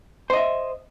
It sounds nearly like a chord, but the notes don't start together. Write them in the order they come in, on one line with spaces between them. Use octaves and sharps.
C5 D#5 E5